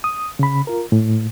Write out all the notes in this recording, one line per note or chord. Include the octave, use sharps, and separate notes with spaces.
D#6
C#3 B5
F4 A#4
A2